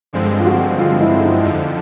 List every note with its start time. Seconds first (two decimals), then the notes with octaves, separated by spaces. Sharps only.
0.13 G2 D3 F3 G#3 C4
0.39 F4
0.46 F#4
0.79 F4
1.01 E4
1.23 D#4
1.44 F2 D3 F3 D#4